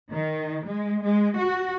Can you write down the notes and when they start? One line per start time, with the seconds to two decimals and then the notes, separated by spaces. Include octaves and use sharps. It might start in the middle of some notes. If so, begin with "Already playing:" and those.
0.10 D#3
0.65 G#3
1.02 G#3
1.37 F#4